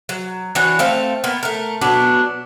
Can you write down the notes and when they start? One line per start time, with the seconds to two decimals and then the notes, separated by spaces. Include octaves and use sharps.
0.09 F#3
0.55 E3 D4 F#4 C#5
0.79 A3 C4 F5
1.24 A#3 B3
1.43 A3 A#4
1.81 B2 F#3 B3 D4